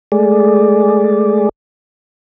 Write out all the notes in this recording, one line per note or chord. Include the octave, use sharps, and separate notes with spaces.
G#3 A3 G#4 D5